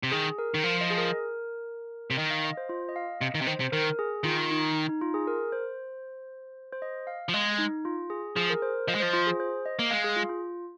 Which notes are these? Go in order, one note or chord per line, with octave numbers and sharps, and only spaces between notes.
C3
D#3 G#4
A#4
D#3
F3
D#5
G#4
A#4
C3
D#3 D#5
F5
D#5
C5
F4
D#5
F5
C3 D#5
D#3
C3
D#3 C5
C3
D#3 A#4
G#4
D#3 F4
D#4
D#4
F4
G#4
A#4
C5
C5
D#5
F5
F3
G#3 D#5
D#4
F4
G#4
F3 G#4
A#4
C5
F3 D#5
G#3
F3 C5
F4
G#4
C5
D#5
A#3
G#3 F5
G#4
F4
F4